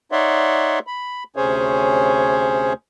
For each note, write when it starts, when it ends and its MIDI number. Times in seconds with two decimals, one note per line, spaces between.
0.12 0.79 63
0.12 0.79 73
0.12 0.79 74
0.12 0.79 76
0.12 0.79 78
0.12 0.79 84
0.87 1.24 83
1.36 2.73 38
1.36 2.73 48
1.36 2.73 61
1.36 2.73 68
1.36 2.73 72
1.36 2.73 73